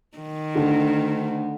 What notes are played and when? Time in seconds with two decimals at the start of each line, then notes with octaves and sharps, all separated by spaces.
0.18 D#3
0.55 D2 D3